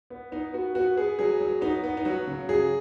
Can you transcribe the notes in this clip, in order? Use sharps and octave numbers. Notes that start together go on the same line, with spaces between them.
B3
B3 D#4
B3 F#4
B3 F#4
B3 G#4
F#3 G#4
F#3
B3 D#4
B3
D#4
F#3 F#4
C#3
F#3 G#4